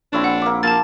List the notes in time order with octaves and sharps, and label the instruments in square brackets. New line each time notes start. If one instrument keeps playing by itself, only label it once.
[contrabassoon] A#1 [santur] C4 E4 C#5 [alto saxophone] D4
[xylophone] F#5
[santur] A#3 D6
[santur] F3 [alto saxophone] A#3 [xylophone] A5 A6